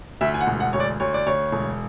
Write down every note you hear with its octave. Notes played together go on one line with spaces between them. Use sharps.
D2 E5
G#5
F#5
E1
F#5
D2 C#5
D5
D2 C#5
D5
D2 C#5
E1